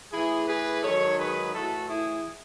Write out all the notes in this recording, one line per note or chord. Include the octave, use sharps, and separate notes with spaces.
A2 E3 E4 G#4
G#4 B4
G#2 D#3 F#3 A4 C#5
G#4 B4
A2 E3 F#4 A4
E4 G#4